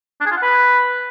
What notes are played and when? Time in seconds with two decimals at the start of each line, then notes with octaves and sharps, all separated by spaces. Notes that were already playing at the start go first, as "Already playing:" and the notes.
0.21 D4
0.26 G#4
0.32 F4
0.37 F#5
0.42 B4